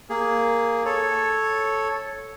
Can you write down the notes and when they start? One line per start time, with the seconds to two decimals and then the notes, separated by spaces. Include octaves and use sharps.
0.10 A#3 G#4
0.85 A4 C#5